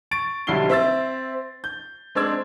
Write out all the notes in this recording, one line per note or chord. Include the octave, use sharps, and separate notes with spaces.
C#6 A6 D7
B1 D3 G3 E4 C7 G7
C4 E5 E6 A6
G6
G#3 C4 D4 D5 E6 G#6